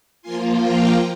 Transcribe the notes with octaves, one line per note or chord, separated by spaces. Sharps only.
F3 A#3 F4 G#5 C6
G5 A#5